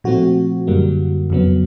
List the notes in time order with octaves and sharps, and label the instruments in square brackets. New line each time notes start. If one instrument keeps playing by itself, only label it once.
[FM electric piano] A#2 F3 A3 C4 F#4
F#2 D3 G3 A#3
F2 C#3 F#3 B3